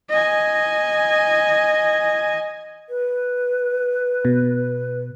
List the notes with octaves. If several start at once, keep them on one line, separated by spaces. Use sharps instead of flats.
D#5 G#5
B4
B2